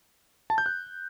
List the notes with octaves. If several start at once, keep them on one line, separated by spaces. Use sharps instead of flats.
A5
G6
F#6